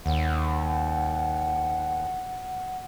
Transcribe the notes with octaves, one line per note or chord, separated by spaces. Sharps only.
D#2 F#5